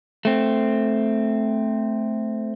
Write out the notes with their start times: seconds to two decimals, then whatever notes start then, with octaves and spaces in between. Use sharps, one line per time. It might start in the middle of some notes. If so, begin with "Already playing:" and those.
0.25 A3 C4